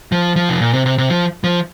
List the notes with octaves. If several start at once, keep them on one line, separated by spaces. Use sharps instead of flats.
F3
F3
C3
A#2
C3
C3
C3
F3
F3